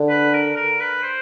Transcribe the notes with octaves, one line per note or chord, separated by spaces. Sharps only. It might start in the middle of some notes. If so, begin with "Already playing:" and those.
Already playing: D3
B4
A#4
A#4
B4
C5